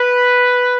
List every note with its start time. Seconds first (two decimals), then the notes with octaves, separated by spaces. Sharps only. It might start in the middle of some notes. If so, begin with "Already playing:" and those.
Already playing: B4